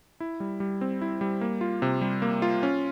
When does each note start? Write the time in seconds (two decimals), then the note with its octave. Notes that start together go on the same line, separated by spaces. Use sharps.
0.20 E4
0.40 G3
0.60 G3
0.81 C4
1.01 E4
1.21 G3
1.41 A#3
1.61 F4
1.82 C3
2.01 G3
2.22 A#3
2.42 F4
2.63 C#4